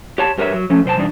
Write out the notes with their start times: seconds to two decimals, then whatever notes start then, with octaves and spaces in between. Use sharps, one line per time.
0.18 G4 C#5 A5
0.38 G2 G4 A#4 B4 C#5 E5
0.53 F#3
0.70 F3 A3 C#4
0.85 F#2 C3 C5 G5 A5
0.97 B2 E3 G3 D4 D#4